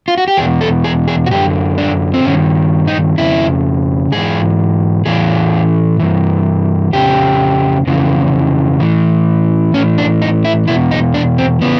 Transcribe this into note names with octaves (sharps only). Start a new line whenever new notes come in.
F4
F#4
G4
E2 B2 G#4
A4
G#4
G#4
F#4
F#2 D3 G4
D4
C4
G2 D#3 C#4
D#4
F2 C#3 E4
G#2 E3 G#4
A2 E3 G#4
G2 E3
F2 C#3 G4
F2 C#3 E3
A2 E3
A2 E3 C#4
D4
D#4
E4
E2 B2 E4
D#4
D4
C4
C#3 E3 B3